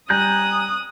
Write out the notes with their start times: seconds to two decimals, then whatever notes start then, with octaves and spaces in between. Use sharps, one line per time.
0.10 G3 G#5 A#5 D#6 F#6 G6